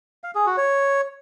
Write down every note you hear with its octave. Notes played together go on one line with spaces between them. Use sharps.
F5
G#4
F#4
C#5